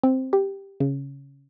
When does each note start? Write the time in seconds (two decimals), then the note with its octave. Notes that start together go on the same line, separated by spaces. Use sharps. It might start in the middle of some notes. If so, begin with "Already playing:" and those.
0.03 C4
0.33 G4
0.80 C#3